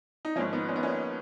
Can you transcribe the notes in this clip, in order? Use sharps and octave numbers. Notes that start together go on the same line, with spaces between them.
D#4
G#1 G#2 F3 A#3 C#4
B3 D#4
C#4
B3
A#3 C#4